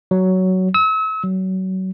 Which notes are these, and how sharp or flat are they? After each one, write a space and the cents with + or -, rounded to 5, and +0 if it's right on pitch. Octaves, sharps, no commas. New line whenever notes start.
F#3 +10
E6 -40
F#3 +25